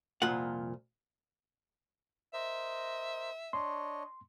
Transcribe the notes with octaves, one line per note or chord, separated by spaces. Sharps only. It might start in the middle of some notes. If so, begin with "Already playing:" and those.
C2 F2 A#2 F4 F#5
A#4 C5 D#5 E5
D4 C#5 D#5 C6